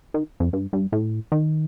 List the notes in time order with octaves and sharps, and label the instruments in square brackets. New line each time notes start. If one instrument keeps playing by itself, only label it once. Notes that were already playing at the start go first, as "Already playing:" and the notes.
[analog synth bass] D#3
F2
G2
G2
A2
D#3